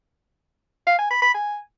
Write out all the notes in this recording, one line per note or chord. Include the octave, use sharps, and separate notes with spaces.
F5
G#5
B5
B5
G#5